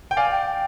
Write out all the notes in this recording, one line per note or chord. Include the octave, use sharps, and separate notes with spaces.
G5
D5 F5 G#5
G5
G5